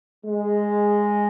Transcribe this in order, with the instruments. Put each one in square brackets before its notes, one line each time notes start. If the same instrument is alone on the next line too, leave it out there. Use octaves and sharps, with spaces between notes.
[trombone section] G#3